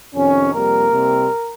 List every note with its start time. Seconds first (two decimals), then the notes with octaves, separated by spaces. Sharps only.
0.15 F2 C3 D#3 C#4
0.53 F2 C3 G3 A#3 A#4
0.90 C2 C3 G3 C4